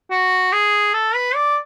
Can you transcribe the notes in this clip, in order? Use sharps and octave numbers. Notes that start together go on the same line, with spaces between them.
F#4
G#4
A4
B4
D5